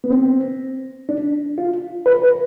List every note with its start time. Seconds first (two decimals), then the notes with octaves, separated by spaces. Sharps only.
0.04 B3
0.11 C4
1.09 D4
1.58 F4
2.06 B4
2.22 B4